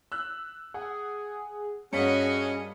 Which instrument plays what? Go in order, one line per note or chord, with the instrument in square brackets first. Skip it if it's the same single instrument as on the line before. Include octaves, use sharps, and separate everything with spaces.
[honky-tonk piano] E6 F#6
[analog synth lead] G#4 [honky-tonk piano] F#5
[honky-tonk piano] G2 A#3 B6 [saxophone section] C#4 G#4 [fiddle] F#4 D#5 [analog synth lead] C#7